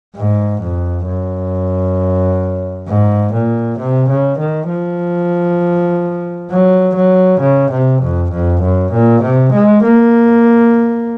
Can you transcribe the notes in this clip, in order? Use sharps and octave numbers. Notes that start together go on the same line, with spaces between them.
G#2
F2
F#2
G#2
A#2
C3
C#3
D#3
F3
F#3
F#3
C#3
C3
F2
F2
F#2
A#2
C3
G#3
A#3